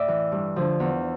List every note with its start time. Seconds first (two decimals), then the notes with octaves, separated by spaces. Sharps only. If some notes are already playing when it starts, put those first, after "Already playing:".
Already playing: A2 D5 E5
0.08 E3
0.32 G2
0.56 D3 F3
0.80 E2